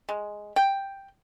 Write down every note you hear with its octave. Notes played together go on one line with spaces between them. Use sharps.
G#3
G5